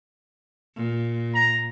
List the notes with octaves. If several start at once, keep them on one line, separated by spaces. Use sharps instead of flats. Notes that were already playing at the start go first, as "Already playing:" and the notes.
A#2
A#5